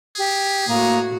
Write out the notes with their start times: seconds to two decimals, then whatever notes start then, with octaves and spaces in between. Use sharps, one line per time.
0.16 G4 G#4
0.68 A2 A#3 F#4 A#5 D#6